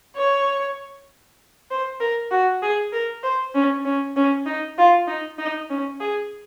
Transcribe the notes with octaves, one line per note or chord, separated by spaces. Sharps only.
C#5
C5
A#4
F#4
G#4
A#4
C5
C#4
C#4
C#4
D#4
F4
D#4
D#4
C#4
G#4